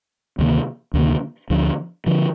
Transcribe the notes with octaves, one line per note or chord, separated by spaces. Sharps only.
D2 C3 D#3 A#3
D2 C3 D#3 A#3
D2 D3 F3
D3 F3